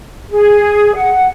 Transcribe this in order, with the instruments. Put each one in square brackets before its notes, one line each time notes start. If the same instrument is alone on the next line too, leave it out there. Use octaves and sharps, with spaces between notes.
[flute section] G#4
F#5